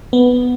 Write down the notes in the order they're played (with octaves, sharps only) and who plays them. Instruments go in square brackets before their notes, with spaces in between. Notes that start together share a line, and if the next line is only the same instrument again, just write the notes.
[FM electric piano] B3